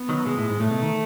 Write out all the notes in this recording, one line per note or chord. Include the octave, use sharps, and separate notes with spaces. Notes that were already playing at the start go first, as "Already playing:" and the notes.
Already playing: B3
D#3 F#3
B2 G#3
A2
G#2
A2 A3
B2
D#3